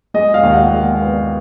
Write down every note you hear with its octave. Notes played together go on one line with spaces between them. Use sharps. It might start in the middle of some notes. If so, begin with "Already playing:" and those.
G#3 D#5
F5
D#2
F#5
G#3
B3